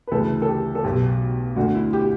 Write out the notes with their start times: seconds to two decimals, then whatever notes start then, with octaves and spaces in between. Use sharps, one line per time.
0.07 B4
0.11 D2 C#3 E3 A4
0.42 A4
0.47 G4
0.75 A4
0.84 B1 B2 G4
1.56 D2 D3 F#4
1.75 E4
1.93 G4